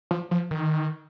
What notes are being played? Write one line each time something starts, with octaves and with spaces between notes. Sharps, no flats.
F3
F3
D#3